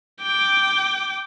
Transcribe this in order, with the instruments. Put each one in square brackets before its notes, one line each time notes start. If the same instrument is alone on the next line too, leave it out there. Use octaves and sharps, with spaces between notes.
[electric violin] G5 D6